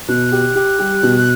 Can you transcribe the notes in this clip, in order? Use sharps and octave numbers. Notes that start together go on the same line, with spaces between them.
B2 F#6
G4
G4
G3
B2